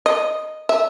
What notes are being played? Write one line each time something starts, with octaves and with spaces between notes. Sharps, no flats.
D#5
E5